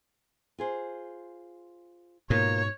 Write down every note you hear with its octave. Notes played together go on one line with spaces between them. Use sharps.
F4 G#4 C5
G#2 B2 A#3 F4 A#4 C#5